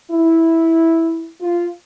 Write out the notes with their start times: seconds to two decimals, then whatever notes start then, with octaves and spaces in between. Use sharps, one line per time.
0.11 E4
1.41 F4